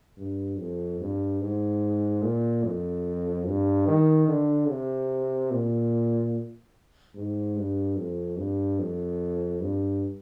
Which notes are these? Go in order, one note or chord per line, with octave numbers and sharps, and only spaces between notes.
G2
F2
G2
G#2
A#2
F2
G2
D#3
D3
C3
A#2
G#2
G2
F2
G2
F2
G2